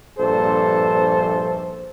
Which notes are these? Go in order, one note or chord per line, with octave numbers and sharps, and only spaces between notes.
A#1 G2 A4 C5